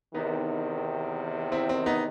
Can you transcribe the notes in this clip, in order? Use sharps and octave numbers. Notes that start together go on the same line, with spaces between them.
E2 C3 D#3 B3 D#4
C4 E4
C4
B3 D#4